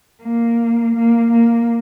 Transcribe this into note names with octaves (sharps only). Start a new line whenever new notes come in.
A#3
A#3
A#3